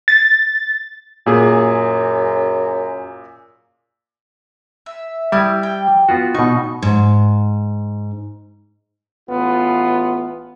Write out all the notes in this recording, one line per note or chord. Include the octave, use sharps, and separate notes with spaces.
A6
F#2 A#2 A#3 G#4
E5
G3 E4 D#6
G5
B3 F4 F#4
B2 D#4 C#6
G#2
A1 B3 F4 B4